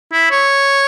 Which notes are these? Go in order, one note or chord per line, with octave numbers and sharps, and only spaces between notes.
E4
C#5